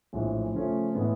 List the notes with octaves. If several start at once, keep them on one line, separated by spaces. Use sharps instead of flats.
A#1 A2 E3 G#3
C#3 F3 A3 C#4
A2 E3 G#3 B3